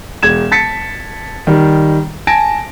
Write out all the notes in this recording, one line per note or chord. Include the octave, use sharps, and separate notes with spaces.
E1 G#6 E7
A5 A6 B6 C#7
D#3 G3
G#5 A5 A#6 D7